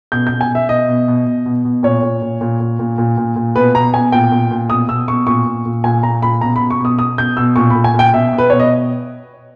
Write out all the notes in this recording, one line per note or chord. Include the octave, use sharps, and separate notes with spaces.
B2 G6
B2 G6
G#5
B2
E5
B2 D#5
B2
B2
B2
B2
B2
A#2 C#5
A#2
A#2
A#2
A#2
A#2
A#2
A#2
A#2
B2 B4
B2 A#5
B2 G#5
A#2 G5
A#2
A#2
B2 D#6
B2 E6
B2 C#6
A#2 C#6
A#2
A#2
A#2 G#5
A#2 A#5
A#2 B5
B2 A#5
B2 B5
C#6
B2 D#6
B2 D#6
B2 G6
B2 E6
A#2 C#6
A#2 B5
G#5
A#2 G5
B2 E5
B2
B4
B2 C#5
D#5